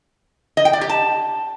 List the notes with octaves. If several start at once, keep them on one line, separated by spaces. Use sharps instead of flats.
D#5
G5
D5
G4
A5